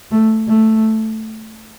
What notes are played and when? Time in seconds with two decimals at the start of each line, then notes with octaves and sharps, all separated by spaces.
0.11 A3
0.47 A3